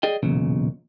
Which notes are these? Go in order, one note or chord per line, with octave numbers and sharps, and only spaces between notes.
G#4 D5 D#5 G5
B1 E2 A#2 C#3